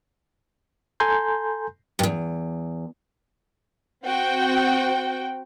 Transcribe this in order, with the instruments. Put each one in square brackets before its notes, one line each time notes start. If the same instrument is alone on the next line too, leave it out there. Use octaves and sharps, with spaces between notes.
[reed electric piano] A4 G#5 A#5 C6 G6
[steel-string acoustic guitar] E2 G2
[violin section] C4 F#4 G5